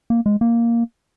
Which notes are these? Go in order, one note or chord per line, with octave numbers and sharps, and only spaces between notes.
A#3
G#3
A#3